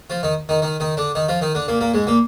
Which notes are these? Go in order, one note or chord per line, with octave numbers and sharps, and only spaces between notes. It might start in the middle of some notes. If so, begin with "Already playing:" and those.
F3 F4
D#3 D#4
D#3 D#4
D#3 D#4
D#3 D#4
D3 D4
D#3 D#4
F3 F4
D#3 D#4
D3 D4
A#2 A#3
A#2 A#3
G#2 G#3
A#2 A#3